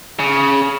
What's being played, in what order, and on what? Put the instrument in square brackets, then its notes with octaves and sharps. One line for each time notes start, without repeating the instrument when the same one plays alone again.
[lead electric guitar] C#3